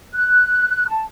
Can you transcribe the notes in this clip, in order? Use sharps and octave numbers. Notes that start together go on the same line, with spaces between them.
F#6
A5